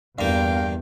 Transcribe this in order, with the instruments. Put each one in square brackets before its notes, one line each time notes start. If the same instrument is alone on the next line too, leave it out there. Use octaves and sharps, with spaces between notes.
[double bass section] E2 [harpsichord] G2 A#3 [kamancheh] F5 G5